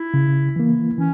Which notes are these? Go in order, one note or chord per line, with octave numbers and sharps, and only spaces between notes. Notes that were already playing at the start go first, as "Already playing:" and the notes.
Already playing: E4
C#3
E3 A#3
E3 C#4